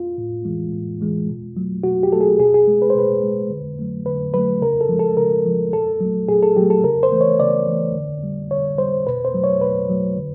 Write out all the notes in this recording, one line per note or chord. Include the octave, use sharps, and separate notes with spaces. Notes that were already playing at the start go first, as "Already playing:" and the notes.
Already playing: F4
A2
E3 G#3
A2
E3 G#3
B2
F#3 A3
B2 F#4
G4
F#3 A3 A4
G#4
B2 G#4
G#4
G#3
B4
C5
B2 B4
G#3
D3
F#3 A3
D3 B4
F#3 A3 B4
C#3 A#4
A4
F3 G#3
A4
C#3 A#4
F3 G#3
A#2 A4
F#3 A3
A#2 G#4
A4
F#3 A3 G4
A4
C#3 A#4
C5
E3 A3
C#5
C#3 D5
E3 A3
D3
G3
D3 C#5
G3 C5
B2 B4
C5
F#3 A3
C#5
B2 B4
F#3 A3
D3